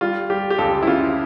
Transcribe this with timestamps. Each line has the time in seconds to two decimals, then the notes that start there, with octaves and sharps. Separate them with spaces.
0.01 G3 F4
0.30 G3 G4
0.50 G4
0.58 C#2 A4
0.83 E4
0.87 C#3 F4